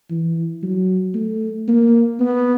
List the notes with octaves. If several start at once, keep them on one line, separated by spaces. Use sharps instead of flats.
E3
F#3
A3
A#3
B3